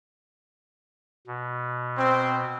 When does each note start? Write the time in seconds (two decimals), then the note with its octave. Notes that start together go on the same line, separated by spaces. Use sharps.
1.27 B2
1.97 C4